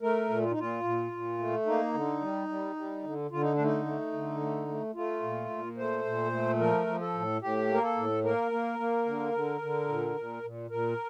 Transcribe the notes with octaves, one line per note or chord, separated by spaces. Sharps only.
A3 A#4
A#2
F4
D#4
A#2 F4
A#2
A#2
A3
A#3 D#4
D3
G3
G3
G3
D3
D3 F4
D#4
D4
A3
D#4
A3
D3
A3
A3
A3 F4
A#2
A#2
A3 C5
A#2
A3
F3 A#4
F3
A4
A2
A2 G4
A#3
A#4
A4
A2
A#3 A#4
A#3
A#3
D3
D3
D3
A#2
A#2
A#2
A#2 A#4